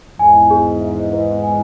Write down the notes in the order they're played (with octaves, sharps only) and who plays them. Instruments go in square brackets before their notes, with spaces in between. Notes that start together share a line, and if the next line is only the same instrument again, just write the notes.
[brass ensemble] E2 G#2 [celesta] G#5
[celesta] G#4
E5
B4
G#5